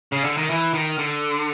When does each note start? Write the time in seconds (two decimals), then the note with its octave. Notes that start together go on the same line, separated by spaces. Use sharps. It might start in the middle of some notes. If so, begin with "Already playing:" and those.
0.12 C#3
0.25 D3
0.38 D#3
0.50 E3
0.74 D#3
0.98 D3